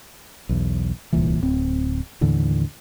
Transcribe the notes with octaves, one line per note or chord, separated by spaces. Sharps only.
B1 E2
D1 C2 A#2 E3
D1 C4
D#2 A2 D3 E3